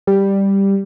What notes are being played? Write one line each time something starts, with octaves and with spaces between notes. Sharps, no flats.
G3